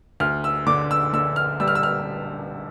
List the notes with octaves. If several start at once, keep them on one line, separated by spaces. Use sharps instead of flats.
D2 F6
E6
D3 D6
E6
D3 E6
F6
G3 E6
F6
E6
F6